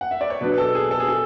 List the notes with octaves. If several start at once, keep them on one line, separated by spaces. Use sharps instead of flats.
F#5
E5
D5
C#5
B2 F#3 B3 D4 B4
A4
G#4
A4
G#4
A4